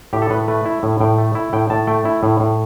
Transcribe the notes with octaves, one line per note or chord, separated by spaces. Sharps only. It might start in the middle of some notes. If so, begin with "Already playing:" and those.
A2 G4
A4
A2 B4
A3 B4
E4 E5
A2
A2 G5
A3
E4
A2 G5
A2 A5
A3 G5
E4
A2
A2